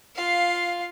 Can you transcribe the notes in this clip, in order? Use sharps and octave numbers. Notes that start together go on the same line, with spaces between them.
F4 F5